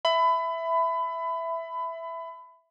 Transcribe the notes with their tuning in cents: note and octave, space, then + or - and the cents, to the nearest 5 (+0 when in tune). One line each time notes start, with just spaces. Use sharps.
E5 +0 B5 +25